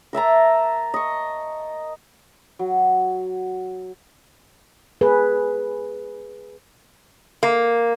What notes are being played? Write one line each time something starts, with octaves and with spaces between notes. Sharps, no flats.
A#4 E5 A5 A#5
D#5 C#6
F#3
G#4 B4
A#3